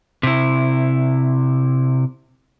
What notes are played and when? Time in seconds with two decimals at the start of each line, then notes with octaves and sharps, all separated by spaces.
0.23 C3 E4